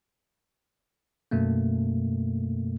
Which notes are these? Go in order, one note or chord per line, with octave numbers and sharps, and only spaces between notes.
F#2 B2 A3 A#3